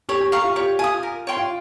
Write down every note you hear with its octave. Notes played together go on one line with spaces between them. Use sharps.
G4 C#5
G4
G4 F5 A#5 C#6
F4
G4 C#5
F4 G#5 D#6
A#4
C#5 G5 C6
F4